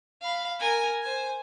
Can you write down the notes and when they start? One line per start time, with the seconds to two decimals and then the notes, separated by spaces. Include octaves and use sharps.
0.22 F5 B5
0.60 A#4 G#5
1.02 C5 G#5